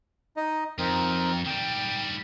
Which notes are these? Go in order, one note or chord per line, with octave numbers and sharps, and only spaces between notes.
D#4 D#5
F2 C4 D#4 A#4
D#3 G3 G5